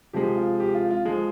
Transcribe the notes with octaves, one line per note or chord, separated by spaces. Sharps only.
C3 F3 G#3 G4
F4
G4
F4
F4
F3 G#3